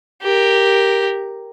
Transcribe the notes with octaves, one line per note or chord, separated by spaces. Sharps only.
G4 A#4